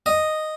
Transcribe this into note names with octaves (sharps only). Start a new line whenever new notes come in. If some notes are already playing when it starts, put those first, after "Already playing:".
D#5